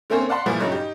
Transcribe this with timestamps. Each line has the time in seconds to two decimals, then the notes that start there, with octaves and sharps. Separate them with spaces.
0.10 D3 A3 A#3 C4 C#4 C5
0.29 D5 F5 F#5 A5 B5 C6
0.46 A#2 E3 F3 G3 A3
0.60 G2 C#3 F#3 A3 D#4
0.72 D#4 G4